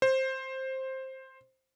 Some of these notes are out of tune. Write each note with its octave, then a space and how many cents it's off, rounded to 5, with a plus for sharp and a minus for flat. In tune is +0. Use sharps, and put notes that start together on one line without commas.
C5 +10